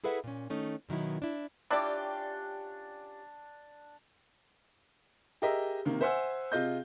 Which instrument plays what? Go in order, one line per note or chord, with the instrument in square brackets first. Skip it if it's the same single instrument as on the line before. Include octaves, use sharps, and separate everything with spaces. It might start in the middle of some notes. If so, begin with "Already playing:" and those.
[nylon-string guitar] E4 G#4 A4 B4 E5 F#5
A#2 C#4
D#3 A3 C#4 D#4
B2 D#3 F#3 E4
D4 E4
[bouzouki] C#4 F4 G4 [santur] D4 [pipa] E4 D5
[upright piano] G4 G#4 A#4 D#5 E5
C3 D#3 A#3
C5 E5 F#5 G#5 E6
C3 F4 G#4 D#5 G6